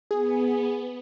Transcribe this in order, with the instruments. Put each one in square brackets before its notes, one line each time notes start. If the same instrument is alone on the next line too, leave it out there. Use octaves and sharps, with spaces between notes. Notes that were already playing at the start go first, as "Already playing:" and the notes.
[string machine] B3 [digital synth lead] G#4